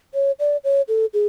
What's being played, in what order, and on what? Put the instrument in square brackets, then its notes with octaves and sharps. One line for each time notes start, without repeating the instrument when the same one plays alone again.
[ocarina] C#5
D5
C#5
A4
G#4